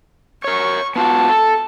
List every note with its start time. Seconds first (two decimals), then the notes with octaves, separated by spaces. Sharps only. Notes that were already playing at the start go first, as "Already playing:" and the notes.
0.44 A#4 C#5 C#6
0.96 B3 F4 F#4 A5
1.29 A4